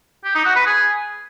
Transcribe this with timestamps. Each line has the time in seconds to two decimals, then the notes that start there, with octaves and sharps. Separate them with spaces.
0.24 G4
0.35 D#4
0.45 F#4
0.56 B4
0.66 G#4